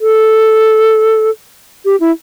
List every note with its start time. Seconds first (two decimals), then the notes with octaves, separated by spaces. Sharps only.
0.01 A4
1.85 G4
2.00 E4